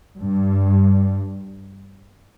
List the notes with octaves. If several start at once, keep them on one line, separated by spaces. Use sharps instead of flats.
G2